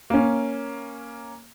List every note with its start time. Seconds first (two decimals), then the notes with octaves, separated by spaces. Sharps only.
0.10 A#3 C#4